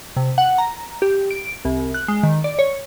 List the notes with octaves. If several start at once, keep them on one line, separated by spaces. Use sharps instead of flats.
C3
F#5
A#5
G4
D7
C2
F#6
G#3
D#3
D5
C#5